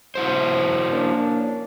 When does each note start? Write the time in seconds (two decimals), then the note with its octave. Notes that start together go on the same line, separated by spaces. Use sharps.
0.15 E4 F#4 C5
0.91 A#3 C#4 D4